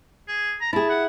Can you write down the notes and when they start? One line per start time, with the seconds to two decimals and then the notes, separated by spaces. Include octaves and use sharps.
0.28 G#4
0.61 A#5
0.73 E4 G#4 A5
0.90 F#5